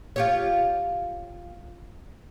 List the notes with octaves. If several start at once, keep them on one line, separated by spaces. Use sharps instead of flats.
F4 G4 C#5